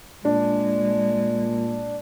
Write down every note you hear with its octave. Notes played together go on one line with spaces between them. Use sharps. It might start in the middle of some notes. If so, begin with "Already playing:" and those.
A#2 G#3 D4